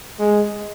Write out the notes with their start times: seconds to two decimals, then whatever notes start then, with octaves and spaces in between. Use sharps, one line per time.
0.19 G#3